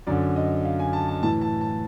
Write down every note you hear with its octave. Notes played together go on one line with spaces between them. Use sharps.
F#2 D3 D5
D#5
F5
G#5
A5
A5
A2 E3 A5
A5
A5